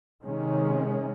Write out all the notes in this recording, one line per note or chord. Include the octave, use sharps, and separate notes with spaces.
C3 D#3 G#3 C#4